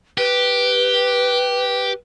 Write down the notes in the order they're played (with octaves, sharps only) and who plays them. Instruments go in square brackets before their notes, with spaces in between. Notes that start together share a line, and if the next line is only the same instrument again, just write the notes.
[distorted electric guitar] G4 [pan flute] B4